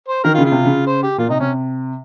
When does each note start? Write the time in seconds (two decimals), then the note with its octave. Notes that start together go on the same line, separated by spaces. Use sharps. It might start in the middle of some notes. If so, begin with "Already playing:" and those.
0.08 C5
0.24 D#3 A#4
0.35 F4
0.38 C#3
0.45 F4
0.52 C3
0.65 C#3
0.87 C5
1.03 G4
1.18 A#2 F4
1.29 C3 D#4
1.40 C3 C#4